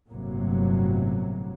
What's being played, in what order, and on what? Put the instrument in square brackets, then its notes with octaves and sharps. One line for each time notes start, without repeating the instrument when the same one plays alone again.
[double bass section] G1 A2 C3 F#3 A#3